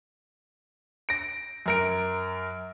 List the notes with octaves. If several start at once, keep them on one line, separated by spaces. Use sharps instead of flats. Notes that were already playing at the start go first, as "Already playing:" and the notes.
A#6 D7
F#2 A#4 D7